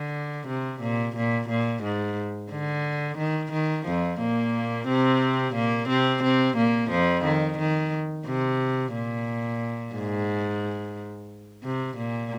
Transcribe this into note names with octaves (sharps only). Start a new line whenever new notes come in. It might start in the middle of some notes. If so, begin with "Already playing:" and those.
Already playing: D3
C3
A#2
A#2
A#2
G#2
D3
D#3
D#3
F2 F3
A#2 A#3
C3 C4
A#2 A#3
C3 C4
C3 C4
A#2 A#3
F2 F3
D#3
D#3
C3
A#2
G#2
C3
A#2